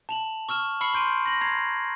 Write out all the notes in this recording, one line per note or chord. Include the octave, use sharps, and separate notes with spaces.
A5 F7 F#7
C#6 E6 F6 E7
B5 C#6 E6 C7 C#7 F#7
C6 G6 D7 D#7
A#6 F#7
A#5 G#6 C7